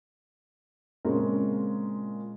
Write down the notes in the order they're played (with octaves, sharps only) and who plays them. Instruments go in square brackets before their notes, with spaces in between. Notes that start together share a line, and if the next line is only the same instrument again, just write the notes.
[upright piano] A#2 C#3 G#3 C4 C#4 A#4